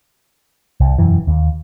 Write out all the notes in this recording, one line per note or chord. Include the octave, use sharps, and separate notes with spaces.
C2
E1 F#2 E3
D#2